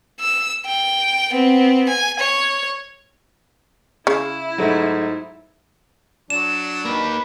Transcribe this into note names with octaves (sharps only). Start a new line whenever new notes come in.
E6
G5
B3 C4
G#5
C#5
C#3 E4
G#2 F#3 G#3 A3
F#3 D4 E7
A#3 D#4 B4